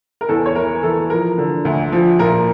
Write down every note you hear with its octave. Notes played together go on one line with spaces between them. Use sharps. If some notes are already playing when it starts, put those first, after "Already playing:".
A#4
E2 A4
C#5
E3 A#4
E3 A4
F3 A#4
D3
D2
F3
A#2 A#4